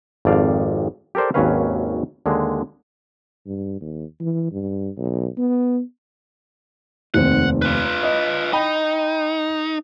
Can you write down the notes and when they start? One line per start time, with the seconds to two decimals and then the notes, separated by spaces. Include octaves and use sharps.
0.25 G#1 F2 D5 F5
1.15 G4 A4 A#4 C5 D5
1.34 G#1 D#2 F#3 C#4 B4 F5
2.26 D#2 D3 G#3
3.46 G2
3.81 D#2
4.20 E3
4.52 G2
4.98 B1
5.38 B3
7.14 F1 D#2 C4 F#5
7.62 F4 B4
8.03 D#5
8.53 D#4 G5 B5